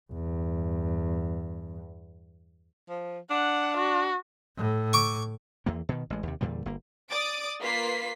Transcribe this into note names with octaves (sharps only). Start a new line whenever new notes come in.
E2 G2
F3
D4 F#5
F#4
A2
C#6 D6
E2 E3 A#3
B2 D#3
A1 G#3
D#2 C3
E2 A#2 D3 G3
G1 A#3
D5 D6 D#6 A6 D7
A#3 F4 B4 B6 C7